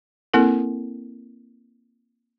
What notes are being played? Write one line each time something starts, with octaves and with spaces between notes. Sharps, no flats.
A#3 C4 E4 A4 A#4